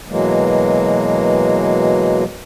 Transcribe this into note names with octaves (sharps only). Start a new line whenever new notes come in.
B2 E3 F#3 G#3 A#3